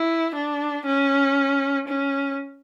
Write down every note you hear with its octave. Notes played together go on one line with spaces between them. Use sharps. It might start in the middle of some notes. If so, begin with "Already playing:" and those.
Already playing: E4
D4
C#4
C#4